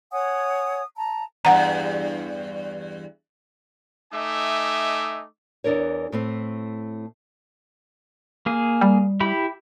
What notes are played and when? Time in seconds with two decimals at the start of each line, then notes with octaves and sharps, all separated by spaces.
0.11 C#5 F#5 G#5 D#6
0.97 A5 A#5
1.45 E2 G2 F#5 A#5
4.12 A3 D#4 D#5 E5 G#5 D6
5.64 E2 E3 D4 A#4 C#5
6.12 A2 A3 C4
8.46 A#3 G#4
8.81 G3
9.20 E4 G4 B5